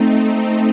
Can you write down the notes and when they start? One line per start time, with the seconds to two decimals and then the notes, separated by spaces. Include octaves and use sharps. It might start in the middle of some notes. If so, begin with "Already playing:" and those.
Already playing: A3 C4 D#4